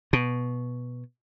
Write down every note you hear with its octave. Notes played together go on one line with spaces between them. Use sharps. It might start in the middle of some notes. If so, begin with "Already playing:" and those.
B2